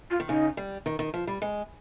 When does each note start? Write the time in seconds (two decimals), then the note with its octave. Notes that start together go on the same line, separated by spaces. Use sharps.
0.10 F4
0.20 D#3
0.29 C#3 D#4
0.57 G3
0.86 D#3
0.99 D#3
1.14 F3
1.27 G3
1.42 G#3